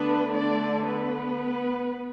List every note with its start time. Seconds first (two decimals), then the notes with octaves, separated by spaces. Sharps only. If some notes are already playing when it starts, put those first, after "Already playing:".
Already playing: D3 A3 B3 D4 B4
0.35 D4 D5
0.86 B3 B4